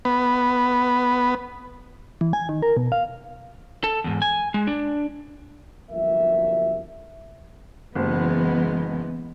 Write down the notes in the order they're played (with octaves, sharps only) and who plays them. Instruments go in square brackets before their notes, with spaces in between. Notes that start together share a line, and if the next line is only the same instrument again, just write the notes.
[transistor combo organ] B3
[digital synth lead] E3
G#5
D#3
A#4
B2
F5
[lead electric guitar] A4
E2 G#2
G#5
G#3
D4
[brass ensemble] G1 C2 F3 F#3 A#3 E5
[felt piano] F#1 [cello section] E3 G#3 B3